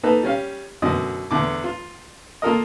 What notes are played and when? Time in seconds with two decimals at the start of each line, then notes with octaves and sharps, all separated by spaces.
0.03 A#3 D#4 A4 B4
0.23 G3 C#4 F5
0.82 F#2 B2 D3 D#5
1.31 E2 D3 D6
1.64 F4
2.42 A#3 F4 A4 A#4 D#5